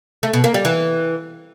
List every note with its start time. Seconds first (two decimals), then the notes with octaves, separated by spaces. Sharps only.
0.23 A3
0.33 B2
0.44 A#3
0.54 G3
0.65 E3